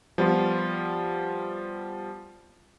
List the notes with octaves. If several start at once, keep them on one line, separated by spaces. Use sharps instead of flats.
F3 G3 B3 F4